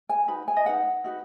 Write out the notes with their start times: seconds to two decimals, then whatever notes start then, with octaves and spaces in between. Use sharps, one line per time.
0.09 G#5
0.28 D#4 F#4 B4 B5
0.48 G#5
0.57 D#5
0.66 D#4 F#4 B4 F#5
1.04 D#4 F#4 B4